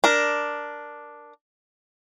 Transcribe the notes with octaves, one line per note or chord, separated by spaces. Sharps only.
D4 A#4